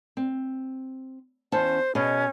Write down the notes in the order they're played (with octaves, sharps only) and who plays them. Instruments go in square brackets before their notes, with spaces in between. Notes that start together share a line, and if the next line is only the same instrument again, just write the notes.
[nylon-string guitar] C4
[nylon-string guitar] E2 C#4 A5 [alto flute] C5
[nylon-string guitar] B2 G#4 D#5 [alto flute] C#4